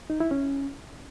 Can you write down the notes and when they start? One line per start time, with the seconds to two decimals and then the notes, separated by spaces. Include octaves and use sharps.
0.10 D#4
0.20 E4
0.31 C#4